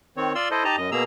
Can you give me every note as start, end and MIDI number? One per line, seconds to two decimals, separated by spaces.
0.17 0.33 51
0.17 0.33 60
0.17 0.33 73
0.35 0.49 65
0.35 0.49 74
0.35 0.49 84
0.35 0.49 88
0.51 0.64 64
0.51 0.64 69
0.51 0.64 72
0.51 0.64 75
0.65 0.76 63
0.65 0.76 67
0.65 0.76 75
0.65 0.76 81
0.65 0.76 82
0.77 0.90 42
0.77 0.90 75
0.92 1.04 47
0.92 1.04 58
0.92 1.04 68
0.92 1.04 82
0.92 1.04 88